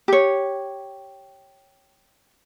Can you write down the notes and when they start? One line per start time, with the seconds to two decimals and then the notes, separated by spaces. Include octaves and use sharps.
0.08 G4 C#5